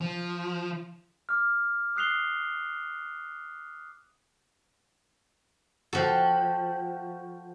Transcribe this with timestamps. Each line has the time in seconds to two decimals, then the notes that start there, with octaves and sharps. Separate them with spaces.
0.01 F3
1.29 D6 F6
1.96 D#6 F#6 C7 F7 G7
5.93 F3 F#4 A4 G5